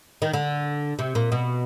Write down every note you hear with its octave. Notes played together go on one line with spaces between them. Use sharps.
D#3
D3
C3
A#2
B2